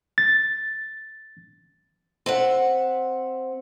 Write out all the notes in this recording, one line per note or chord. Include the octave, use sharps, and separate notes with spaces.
A6
C4 E5 F#5